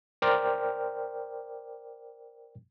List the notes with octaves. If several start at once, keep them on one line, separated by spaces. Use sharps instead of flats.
A#4 C5 D5 G5 D6 F6